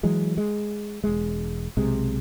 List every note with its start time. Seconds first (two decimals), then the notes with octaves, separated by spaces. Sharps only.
0.03 E3 F#3 G#3
0.37 G#3
1.04 E1 G#3
1.77 B1 C3 G#3